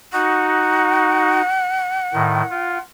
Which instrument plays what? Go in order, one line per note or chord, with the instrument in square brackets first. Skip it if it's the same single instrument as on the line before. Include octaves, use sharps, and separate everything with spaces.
[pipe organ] D#4 F#4 [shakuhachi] F#5
[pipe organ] A2 D#3
F4